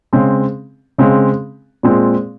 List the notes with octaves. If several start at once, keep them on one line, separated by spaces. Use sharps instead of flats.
C#3 G#3 C4
C#3 G#3 C4
A#2 G#3 C4